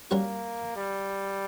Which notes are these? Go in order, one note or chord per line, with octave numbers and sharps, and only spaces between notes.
G3 A#3 C#4 F#4 A#4
G3